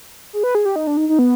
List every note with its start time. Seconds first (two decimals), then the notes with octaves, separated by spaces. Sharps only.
0.33 G#4
0.44 B4
0.55 G#4
0.65 G4
0.76 D#4
0.87 D4
0.97 D#4
1.09 D#4
1.19 B3